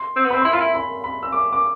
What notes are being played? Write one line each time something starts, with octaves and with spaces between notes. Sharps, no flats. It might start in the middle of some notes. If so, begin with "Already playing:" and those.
Already playing: C6
C4
B3
C4 B5
E4 C6
F4 B5
E4
B5
B5
E6
D6
D6